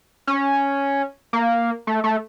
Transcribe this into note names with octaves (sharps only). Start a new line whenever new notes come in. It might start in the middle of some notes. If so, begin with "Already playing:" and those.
C#4
A#3
A3
A3